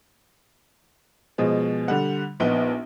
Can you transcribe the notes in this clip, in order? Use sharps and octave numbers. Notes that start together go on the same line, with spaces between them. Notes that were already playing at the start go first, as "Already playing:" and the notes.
B2 F3 G#3
D3 G3 F#5
A#1 B3 D#4 G7